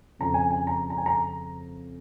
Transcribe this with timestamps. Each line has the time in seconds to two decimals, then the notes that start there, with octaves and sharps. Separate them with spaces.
0.19 F2 C#3 F3 A#5
0.34 G#5
0.51 G#5
0.67 A#5
0.90 A#5
0.98 G#5
1.06 A#5